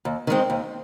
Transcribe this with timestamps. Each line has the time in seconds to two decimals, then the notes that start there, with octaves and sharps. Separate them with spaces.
0.05 D#2
0.27 D#3 G#3 C4
0.50 D#2